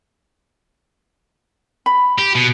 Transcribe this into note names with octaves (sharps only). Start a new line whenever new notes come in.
B5
G4
B2